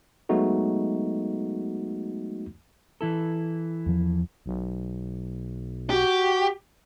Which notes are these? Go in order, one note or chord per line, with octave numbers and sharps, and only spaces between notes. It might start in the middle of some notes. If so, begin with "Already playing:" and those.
F#3 G#3 A3 B3 D#4 F#4
E3 E4 A4
E2 F3
B1
F#4 G4